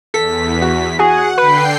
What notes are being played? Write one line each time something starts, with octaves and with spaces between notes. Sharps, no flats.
E2 A4 B6
F#4
F#4 G#4 F#5
D3 B4 G5 C7